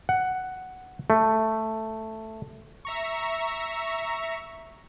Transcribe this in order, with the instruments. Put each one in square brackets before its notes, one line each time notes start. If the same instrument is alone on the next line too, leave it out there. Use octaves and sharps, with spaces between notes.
[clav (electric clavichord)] F#5
A3
[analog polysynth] E5 A#5 C#6